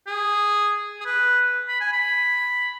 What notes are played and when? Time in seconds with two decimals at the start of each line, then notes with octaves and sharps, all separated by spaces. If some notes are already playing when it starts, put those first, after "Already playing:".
0.07 G#4
1.01 G#4
1.05 B4
1.68 B5
1.81 G#5
1.93 B5